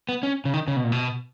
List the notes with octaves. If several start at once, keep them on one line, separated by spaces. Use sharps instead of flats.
B3
C#4
C#3
D#3
C#3
B2
A#2
B2